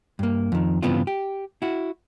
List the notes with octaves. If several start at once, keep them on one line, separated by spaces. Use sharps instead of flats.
G2 A#3
F2 D#3
G2 C#3 E3 B3 C4 F4
G4
E4 F#4